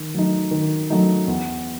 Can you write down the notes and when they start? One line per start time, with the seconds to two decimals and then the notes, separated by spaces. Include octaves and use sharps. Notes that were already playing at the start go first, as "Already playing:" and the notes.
Already playing: D#3
0.14 F#3 A3 D#4
0.51 D#3
0.90 F#3 A3 D#4
1.28 E2